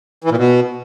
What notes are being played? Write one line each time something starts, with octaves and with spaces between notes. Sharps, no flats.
E3
A#2
B2